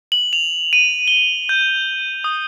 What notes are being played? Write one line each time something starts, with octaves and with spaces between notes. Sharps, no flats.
F#7
F7
D#7
G7
G6
D#6